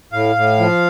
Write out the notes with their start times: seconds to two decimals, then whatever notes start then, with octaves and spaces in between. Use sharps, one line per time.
0.13 A2 F5
0.36 A2
0.59 F3